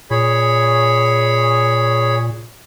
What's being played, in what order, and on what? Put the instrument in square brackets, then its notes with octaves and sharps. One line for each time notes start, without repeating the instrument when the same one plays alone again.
[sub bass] A#2 [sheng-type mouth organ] G#4 C#5 B5